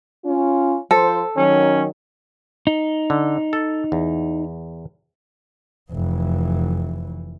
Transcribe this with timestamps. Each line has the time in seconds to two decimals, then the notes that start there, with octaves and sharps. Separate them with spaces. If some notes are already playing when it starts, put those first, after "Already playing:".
0.24 C#4 F4
0.91 F3 A4 C5
1.37 D#3 F#3 C#4
2.67 D#4
3.10 D3
3.53 A4
3.92 E2
5.92 F1 E3